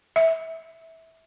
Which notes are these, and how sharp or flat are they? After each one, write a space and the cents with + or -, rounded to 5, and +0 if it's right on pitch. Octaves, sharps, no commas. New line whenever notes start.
E5 -20